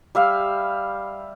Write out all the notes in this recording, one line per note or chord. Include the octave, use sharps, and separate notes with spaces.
G3 E5 F5